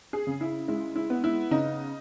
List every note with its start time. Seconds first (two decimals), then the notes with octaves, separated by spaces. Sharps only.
0.13 G#4
0.27 C#3
0.41 E4
0.68 G#3 E4
0.96 E4
1.10 B3
1.24 E4
1.51 C#3 D#4